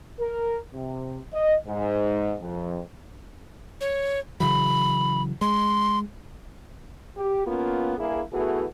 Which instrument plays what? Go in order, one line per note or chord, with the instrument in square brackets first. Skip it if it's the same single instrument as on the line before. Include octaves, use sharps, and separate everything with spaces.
[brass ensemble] A#4
C3
D#5
G#2
F2
[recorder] C#5
[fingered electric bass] C#3 E3 F#3 [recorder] B5
[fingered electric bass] G#3 [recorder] C6
[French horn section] G4
A#3 B3 C#4 F4
G2 A#3 E4 G#4
E3 A3 B3 F#4 G#4